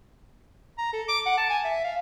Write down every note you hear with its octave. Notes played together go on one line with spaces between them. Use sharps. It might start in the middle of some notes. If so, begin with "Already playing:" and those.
A#5
A4
D6
F#5
A5
G#5
E5
F5